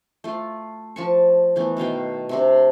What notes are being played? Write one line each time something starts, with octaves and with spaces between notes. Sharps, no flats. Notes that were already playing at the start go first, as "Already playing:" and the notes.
A3 F4
F3 A5 C#6
E3 A3 B3
B2 D#3 F5 G5
C3 C4 D4